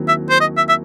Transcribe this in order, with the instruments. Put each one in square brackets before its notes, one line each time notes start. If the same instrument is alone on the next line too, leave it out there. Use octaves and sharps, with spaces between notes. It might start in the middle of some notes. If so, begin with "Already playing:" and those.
Already playing: [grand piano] D#2 D#3 F#3 C4 E4
[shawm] E5
C5
D#5
E5
E5